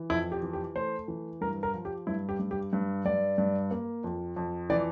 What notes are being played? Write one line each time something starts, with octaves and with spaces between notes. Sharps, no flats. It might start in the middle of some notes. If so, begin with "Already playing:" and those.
Already playing: E3
F2 E4
G4
E3
G4
A3 C5
E3
G2 A#4
A#4
F3
G4
G2 E4
G4
G2
G4
G2
G2 D5
G2
A#3
F2
F2
E3 D5